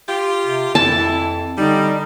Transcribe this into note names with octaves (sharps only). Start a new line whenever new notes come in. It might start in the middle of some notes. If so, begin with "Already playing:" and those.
F4 G4
C3
F2 E3 E4 A5
D3 G3 D#4